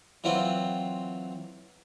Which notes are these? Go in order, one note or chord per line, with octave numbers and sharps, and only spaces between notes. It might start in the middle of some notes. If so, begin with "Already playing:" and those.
E3 F#3 C4 F4